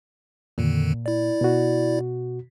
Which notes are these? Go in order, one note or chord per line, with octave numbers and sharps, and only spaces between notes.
F2 A#2 D3 D#3
E4 D5
B2 F#4